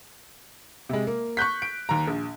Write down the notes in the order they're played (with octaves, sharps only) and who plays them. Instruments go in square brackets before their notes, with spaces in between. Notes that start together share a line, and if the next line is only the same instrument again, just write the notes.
[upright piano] C3 G#3
A#3
C#6 F#6 G6 B6
D7
D#2 A#5
A#1